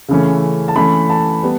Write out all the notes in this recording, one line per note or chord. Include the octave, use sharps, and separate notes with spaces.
C#3 E3 A3 C#4
A5
E3 A3 C#4 B5
A5
G3 B3